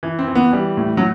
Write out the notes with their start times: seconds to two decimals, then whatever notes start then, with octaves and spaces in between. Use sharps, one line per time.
0.03 E3
0.19 C4
0.28 E3
0.35 B3
0.52 E3 G3
0.77 A2
0.97 F#3